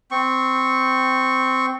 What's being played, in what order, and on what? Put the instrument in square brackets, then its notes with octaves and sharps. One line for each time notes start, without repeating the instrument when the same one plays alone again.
[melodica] C4 C#6